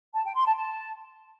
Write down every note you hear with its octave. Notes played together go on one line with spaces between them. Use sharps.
A5
G5
C6
A5
A5